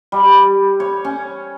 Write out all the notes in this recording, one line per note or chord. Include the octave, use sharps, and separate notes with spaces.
G3
C#5
C#4